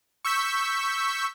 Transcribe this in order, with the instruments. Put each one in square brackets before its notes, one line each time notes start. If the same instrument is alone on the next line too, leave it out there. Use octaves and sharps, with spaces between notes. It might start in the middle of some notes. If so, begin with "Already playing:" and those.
[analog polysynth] C#6 E6 G6 B6